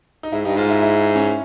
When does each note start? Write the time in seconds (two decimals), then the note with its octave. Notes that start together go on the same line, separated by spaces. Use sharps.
0.23 D#4
0.32 G#2 E4
0.45 G2 D#4
0.57 G#2 F4
0.70 E4
0.82 E4
1.16 C#4